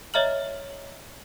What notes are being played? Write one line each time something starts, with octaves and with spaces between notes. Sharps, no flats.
C#5 D#5 E5 A#5 F6 F#7